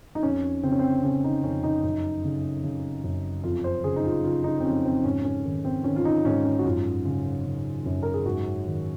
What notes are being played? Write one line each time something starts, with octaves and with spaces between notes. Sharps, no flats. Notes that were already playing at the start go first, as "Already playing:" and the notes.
D#4
F2 C#4
C#3 C4
C#4
C4
C#3 C#4
D#4
F2 C#4
D#4
F#2
C#3
C#3
F#2
F2 F4
C5
C#3 G#4
D#4
F4
C#3 F4
D#4
C4
F2 C#4
C4
G#2 C#4
C#4
D#3
C4
D#3 C#4
F4
D#4
G#2 C#4
C#4
F#4
F#2 F4
C#3
C#3
F#2
A#4
G#4
G#2 F#4
D#3